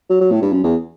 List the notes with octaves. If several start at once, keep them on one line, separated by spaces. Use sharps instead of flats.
F#3
F#3
A2
G2
F#2
E2